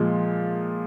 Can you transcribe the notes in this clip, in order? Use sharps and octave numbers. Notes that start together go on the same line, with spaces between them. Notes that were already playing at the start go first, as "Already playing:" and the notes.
Already playing: A#2 F3 G#3